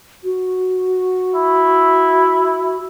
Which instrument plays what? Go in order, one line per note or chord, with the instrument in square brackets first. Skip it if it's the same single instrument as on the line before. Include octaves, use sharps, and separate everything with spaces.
[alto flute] F#4
[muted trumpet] E4